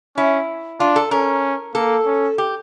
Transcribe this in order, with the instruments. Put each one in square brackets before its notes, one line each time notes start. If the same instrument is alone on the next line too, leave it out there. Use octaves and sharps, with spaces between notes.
[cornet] C#4 [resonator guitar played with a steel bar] E4
[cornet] D4 [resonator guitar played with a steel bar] F4
[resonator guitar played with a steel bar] A4
[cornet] C#4 [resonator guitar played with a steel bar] A#4
[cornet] A#3 [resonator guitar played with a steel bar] A4
[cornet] C#4
[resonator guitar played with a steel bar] G4